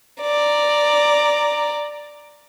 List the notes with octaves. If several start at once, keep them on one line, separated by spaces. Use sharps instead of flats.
D5 A#5